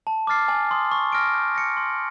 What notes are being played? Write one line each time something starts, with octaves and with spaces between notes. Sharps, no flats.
A5
D6 F6 A6 C7
G#5
C6 D#6
C#6
F6 A#6 D7
G6
A#6 C#7
C6